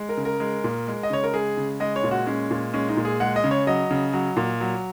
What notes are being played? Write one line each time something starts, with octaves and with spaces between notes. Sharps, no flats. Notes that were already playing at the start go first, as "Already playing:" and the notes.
Already playing: G#3
A#4
C#3
A#4
G#3
A#2
G#3
D#5
C#3 C#5
A#4
G#3 G#4
C#3
G#3 D#5
C#5
A#2
F#4
G#3 C#4
A#2
G#3 C#4
D#4
A#2
G#4
G#3 F#5
D#5
C#3
C#5
F#3 D#5
C#3
F#3
A#2
F#3